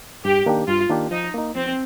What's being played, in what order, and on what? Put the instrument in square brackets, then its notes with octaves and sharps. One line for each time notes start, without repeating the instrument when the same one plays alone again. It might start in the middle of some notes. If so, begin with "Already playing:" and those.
[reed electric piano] G2 [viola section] G4
[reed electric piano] D#3 A#3 D4 G4
[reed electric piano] G2 [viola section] F4
[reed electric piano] D#3 A#3 D4 G4
[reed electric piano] F3 [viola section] D#4
[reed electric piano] A#3 D#4
[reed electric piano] F3 [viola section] C4